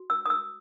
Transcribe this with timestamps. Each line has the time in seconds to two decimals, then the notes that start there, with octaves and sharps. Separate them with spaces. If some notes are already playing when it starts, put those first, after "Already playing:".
Already playing: F#4
0.10 E6
0.26 D#6
0.30 E6